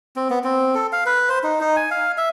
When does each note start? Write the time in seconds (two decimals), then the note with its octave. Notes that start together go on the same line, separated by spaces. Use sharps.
0.16 C4
0.30 B3
0.44 C4
0.75 A4
0.92 F5
1.06 B4
1.29 C5
1.44 D#4
1.61 D#4
1.76 G#5
1.91 F5
2.18 E5